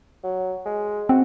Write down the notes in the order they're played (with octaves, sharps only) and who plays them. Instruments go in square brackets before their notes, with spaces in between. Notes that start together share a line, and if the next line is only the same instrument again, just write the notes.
[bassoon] F#3
G#3
[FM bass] C4 [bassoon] F#4